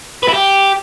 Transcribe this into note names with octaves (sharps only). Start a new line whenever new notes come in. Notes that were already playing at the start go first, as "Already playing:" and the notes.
B4
E4
G4